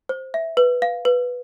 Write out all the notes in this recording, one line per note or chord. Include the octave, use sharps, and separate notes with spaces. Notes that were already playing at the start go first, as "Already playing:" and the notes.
C5
E5
B4
F5
B4